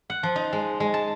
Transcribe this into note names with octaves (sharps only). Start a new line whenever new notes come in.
F#5
F3
D#4
G#3
G#3
A5